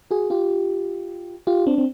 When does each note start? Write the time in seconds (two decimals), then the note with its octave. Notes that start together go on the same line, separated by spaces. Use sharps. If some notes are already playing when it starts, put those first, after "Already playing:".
0.11 F#4 G#4
0.30 F4 G4
1.47 F4 G4
1.66 C4 D4
1.78 C4